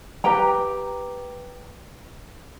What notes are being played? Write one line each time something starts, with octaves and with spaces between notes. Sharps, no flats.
G4 B4 G5 A#5